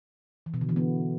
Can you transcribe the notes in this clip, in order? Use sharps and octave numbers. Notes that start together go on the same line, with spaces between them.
E3
B2
D3
E3
B3